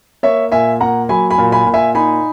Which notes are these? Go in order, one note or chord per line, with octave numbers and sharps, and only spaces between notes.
A#3 C#5 E5
A#2 E5 G#5
A#3 F#5 A#5
F#3 G#5 B5
G#5 B5
A#2
G#5 B5
A#2
E5 G#5
D#4 G#5 B5